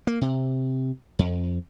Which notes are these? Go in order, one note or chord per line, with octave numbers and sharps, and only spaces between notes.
A#3
C3
F2